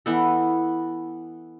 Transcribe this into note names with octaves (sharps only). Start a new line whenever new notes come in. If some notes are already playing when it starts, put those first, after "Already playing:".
E3 B3 A4